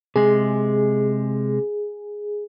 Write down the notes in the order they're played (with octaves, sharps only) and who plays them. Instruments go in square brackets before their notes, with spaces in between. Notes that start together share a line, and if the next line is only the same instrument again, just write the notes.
[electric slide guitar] C3 G#3 [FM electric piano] G#4